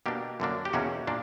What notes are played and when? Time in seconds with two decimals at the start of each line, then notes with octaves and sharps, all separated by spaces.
0.06 B2 A#3 D4 G4
0.40 F#2 D3 A#3 D4
0.65 G4
0.73 E2 B2 A#3 C#4 F#4
1.07 A#2 A#3 D4